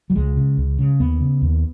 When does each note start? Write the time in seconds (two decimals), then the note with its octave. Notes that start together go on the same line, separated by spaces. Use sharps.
0.10 F#3
0.15 C#2 G#3
0.36 C#3
0.57 C#2
0.78 C#3
0.99 D#2 B3
1.21 C#3
1.41 D#2